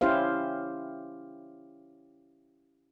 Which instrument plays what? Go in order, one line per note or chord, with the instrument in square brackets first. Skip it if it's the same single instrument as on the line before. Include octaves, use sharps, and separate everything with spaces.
[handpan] C#4 E4 G4 C5 F5